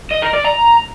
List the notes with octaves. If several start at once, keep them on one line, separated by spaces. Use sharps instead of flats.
D#5
A#4
D5
A#5